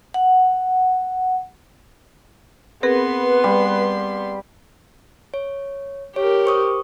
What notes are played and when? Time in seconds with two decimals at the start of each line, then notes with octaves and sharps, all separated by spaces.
0.14 F#5
2.83 B3 C4 G#4 A#4 B4 C6
3.44 G3
5.34 C#5
6.16 G4 A#4 C#5
6.45 C5 C#6 D#6